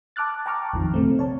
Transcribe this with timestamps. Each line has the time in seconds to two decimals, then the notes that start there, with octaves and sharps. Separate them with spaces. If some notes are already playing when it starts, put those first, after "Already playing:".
0.16 A5 D6 F6 F#6 A6
0.46 G5 A5 A#5 C#6 D6 F6
0.73 A#1 F2 D#3 F3
0.94 C3 A3 C4
1.19 C#5 A5